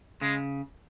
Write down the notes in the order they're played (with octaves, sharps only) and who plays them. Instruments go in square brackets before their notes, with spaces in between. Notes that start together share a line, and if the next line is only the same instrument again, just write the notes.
[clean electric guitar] C#3 [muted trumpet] G#3